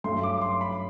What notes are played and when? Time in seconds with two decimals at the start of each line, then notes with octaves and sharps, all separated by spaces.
0.04 G2 F#3 A3 C6
0.23 D6
0.37 D6
0.41 C6
0.61 B5